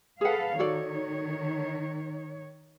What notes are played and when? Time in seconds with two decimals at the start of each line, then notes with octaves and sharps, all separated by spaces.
0.21 G#4 A4 B4 F5 F#5
0.59 D#3 F#4 A4 C#5 D5